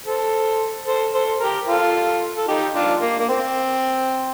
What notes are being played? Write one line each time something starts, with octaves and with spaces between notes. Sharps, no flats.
A4 C5
A4 C5
A4 C5
G4 A#4
F4 A4
A4
D#4 G4
D4 F4
A#3
A#3
C4